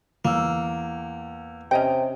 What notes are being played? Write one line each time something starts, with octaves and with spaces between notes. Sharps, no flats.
E2 A#3 E6
C3 C#4 D#5 G5